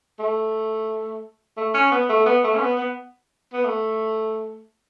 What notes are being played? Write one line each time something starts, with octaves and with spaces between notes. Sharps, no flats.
A3
A3
C#4
B3
A3
B3
A3
C#4
B3
B3
B3
A3